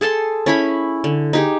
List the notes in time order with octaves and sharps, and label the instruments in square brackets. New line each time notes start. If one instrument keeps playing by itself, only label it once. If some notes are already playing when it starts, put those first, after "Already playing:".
[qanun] G#4 A4 A5 C6
C#4 E4 B5
D3
D#4 G4 G#4